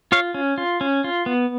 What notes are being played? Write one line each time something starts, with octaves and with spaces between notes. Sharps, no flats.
F4 C#5 F5
C#4
F4
C#4
F4
B3